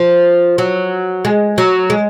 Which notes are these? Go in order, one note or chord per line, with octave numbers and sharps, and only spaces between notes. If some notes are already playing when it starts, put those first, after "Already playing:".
Already playing: F3
F#3
G#3
F#3
G#3